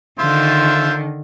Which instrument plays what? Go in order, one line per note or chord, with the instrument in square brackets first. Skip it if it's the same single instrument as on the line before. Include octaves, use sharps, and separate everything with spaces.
[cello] D3 D#3 [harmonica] F4 C5 E5